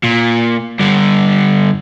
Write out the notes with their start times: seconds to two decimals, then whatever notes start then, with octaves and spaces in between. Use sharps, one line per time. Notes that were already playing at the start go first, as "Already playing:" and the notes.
0.04 A#2
0.80 G2 D3